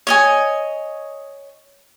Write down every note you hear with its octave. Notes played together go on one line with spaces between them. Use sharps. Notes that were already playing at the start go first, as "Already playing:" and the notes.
C#5 D#5 G#5